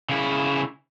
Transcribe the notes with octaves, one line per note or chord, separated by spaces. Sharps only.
C#3 E4